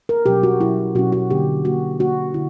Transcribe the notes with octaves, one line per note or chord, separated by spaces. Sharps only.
A#4
B2 F#3 C#4 G4
F#4
B2 F#3 C#4 E4
B2 F#3 C#4 F#4
F#4
D3 A#3 D4 G4
D3 A#3 D4 F#4
D3 A#3 D4 F#4
D3 E4